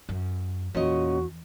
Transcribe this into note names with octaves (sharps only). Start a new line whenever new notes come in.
F#2
E2 A#2 C#4 F#4 D#5